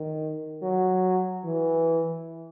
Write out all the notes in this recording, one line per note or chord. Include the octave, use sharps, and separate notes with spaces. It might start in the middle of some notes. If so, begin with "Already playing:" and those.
Already playing: D#3
F#3
E3